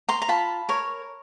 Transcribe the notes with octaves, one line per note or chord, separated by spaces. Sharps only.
A#5 C6
A#5
F4 A5 B5
A#4 C#5